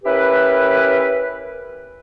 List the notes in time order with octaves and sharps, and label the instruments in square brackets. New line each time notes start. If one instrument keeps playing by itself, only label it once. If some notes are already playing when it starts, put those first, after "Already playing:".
[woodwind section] C#4 E4 G4 A#4 B4